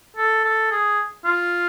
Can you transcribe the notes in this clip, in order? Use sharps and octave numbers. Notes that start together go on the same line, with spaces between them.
A4
A4
G#4
F4